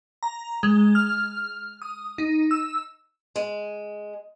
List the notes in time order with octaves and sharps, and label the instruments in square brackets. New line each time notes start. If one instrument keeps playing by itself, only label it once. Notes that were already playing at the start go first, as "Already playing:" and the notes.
[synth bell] A#5
G#3
F6
D#6
D#4
E6
[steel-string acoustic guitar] G#3